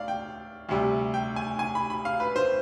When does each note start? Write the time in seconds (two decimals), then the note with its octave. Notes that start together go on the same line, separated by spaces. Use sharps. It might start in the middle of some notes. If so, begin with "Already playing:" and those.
Already playing: D2 D5 F5
0.08 G5
0.69 D2 C3 G3
1.14 G5
1.36 G#5
1.59 G#5
1.75 B5
1.90 B5
2.05 F5
2.20 B4
2.36 C5